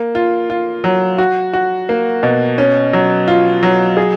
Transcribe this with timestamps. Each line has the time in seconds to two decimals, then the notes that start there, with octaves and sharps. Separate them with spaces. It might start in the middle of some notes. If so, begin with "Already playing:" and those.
Already playing: A#3
0.15 F4
0.50 F4
0.84 F#3
1.18 F#4
1.53 F#4
1.89 A#3
2.23 B2
2.58 C#4
2.93 F#3
3.28 F4
3.63 F#3
3.97 G#4